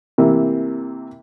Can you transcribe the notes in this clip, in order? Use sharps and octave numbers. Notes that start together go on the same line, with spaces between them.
C3 E3 A#3